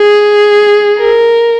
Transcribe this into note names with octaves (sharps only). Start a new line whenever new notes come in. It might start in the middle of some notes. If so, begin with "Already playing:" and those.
Already playing: G#4
A#4